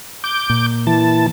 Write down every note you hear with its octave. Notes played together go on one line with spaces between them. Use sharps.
D6 G6
A#2
E3 A5